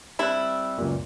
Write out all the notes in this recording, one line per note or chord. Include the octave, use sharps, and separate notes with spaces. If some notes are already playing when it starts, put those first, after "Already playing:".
G3 C4 E4 F#6
C#2 F#2 A#2